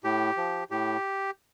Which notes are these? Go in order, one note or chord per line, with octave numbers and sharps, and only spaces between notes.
A2 G4
F3
A2 G4